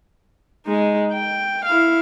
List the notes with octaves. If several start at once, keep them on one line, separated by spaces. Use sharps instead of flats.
G#3 D#4
G5
E4 F5